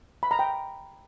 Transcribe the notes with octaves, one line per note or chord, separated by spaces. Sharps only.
B5
A#5
G5